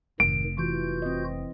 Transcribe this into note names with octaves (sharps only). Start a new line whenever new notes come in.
F1 G#2 D#3 D7
E3 F4 F#4 G6
C4 D#5